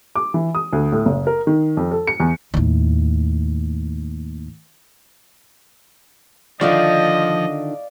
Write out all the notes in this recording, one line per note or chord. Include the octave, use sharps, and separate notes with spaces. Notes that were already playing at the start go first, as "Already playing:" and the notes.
D6
E3
D#6
D2
A2
F#1
A#4
D#3
F2
A4
C#7
E2
D#2 A2
D3 D#3 F3 F4 D5 D#5 F5